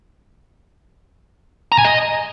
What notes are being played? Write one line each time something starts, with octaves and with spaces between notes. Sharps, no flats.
A#5
G#5
D#5